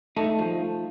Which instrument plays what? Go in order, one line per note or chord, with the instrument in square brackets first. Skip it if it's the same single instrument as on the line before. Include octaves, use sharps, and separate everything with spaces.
[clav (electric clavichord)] A3 [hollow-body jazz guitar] D#4
[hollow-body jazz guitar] F3